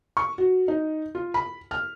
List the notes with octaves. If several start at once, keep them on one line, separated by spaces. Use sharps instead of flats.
C#6
F#4
D#4
F4
B5
F6